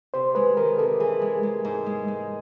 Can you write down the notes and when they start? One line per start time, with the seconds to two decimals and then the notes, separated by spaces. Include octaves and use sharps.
0.14 C3 C5
0.35 G#3 B4
0.57 D#3 A#4
0.78 C3 A4
1.00 E3 G#4
1.22 G#3
1.43 G#3
1.65 G#2
1.86 G#3
2.08 G#3